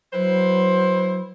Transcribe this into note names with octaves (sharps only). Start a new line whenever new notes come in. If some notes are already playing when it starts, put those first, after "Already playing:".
F#3 E4 B4 C5